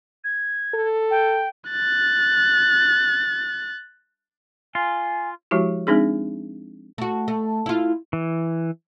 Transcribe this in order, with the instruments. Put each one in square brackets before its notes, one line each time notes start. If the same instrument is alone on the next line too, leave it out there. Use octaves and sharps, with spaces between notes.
[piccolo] G#6
[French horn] A4
[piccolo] G5
[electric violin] F#6 A6
[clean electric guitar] F4 [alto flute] G#5
[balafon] F3 G#3 E4 F#4 G4
G#3 C4 D4 D#4 G#4
[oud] A3 F#4
A3
E4 F4
[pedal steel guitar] E3